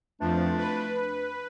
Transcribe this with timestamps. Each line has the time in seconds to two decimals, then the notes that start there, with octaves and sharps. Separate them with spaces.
0.21 F2 E3 F3 A3 D4
0.57 B4